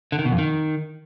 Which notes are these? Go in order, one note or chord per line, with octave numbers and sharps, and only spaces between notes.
D3
D#3
B2
F2
D#3